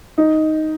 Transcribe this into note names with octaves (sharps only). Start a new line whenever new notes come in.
D#4